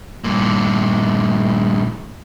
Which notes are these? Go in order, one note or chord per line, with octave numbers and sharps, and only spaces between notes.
G2 A#2